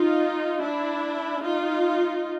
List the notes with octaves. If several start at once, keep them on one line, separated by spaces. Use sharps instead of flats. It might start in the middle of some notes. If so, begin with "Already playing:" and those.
Already playing: D#4 F4
D4 E4
D#4 F4